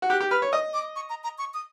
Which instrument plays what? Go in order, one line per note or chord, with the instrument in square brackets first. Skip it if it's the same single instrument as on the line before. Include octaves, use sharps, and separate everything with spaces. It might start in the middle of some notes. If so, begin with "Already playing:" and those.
[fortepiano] F#4
[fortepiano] G4 [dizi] F#6
[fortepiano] G4
[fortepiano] B4 [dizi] F6
[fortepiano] C#5
[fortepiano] D#5 [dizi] D#6
[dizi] D6
C#6
A#5
A#5
C#6
D#6